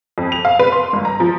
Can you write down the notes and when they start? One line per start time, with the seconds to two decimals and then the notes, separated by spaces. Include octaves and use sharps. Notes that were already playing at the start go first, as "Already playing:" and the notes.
0.18 F2
0.32 F7
0.45 F5
0.59 B4
0.72 C6
0.93 G1
1.05 A#5
1.20 F3